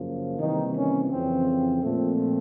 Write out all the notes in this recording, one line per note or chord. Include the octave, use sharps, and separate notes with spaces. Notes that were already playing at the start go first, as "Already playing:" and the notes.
Already playing: F#2 C#3 F3 A#3
C3 D#3 E3 G3 A#3 D#4
C#4
F2 C#3 E3 C4
A#2 F3 A3 C4